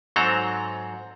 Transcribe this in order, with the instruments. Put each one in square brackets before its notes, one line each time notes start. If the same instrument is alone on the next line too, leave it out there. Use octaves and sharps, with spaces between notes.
[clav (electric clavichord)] G#2 F#3 C4 A4 A#5